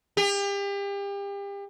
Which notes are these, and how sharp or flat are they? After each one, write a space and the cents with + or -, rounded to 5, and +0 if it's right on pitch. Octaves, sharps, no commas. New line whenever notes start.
G4 +35